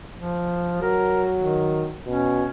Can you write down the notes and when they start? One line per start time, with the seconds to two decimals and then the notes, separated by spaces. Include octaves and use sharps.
0.14 F3
0.82 F#3 A#4
1.37 D#3
2.06 B2 C#4